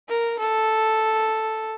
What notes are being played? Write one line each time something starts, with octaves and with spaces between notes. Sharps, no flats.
A#4
A4